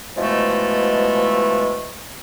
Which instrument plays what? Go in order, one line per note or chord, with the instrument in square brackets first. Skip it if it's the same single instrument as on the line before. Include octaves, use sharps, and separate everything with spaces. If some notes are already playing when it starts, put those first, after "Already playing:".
[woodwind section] B2 E3 F3 G#3 A3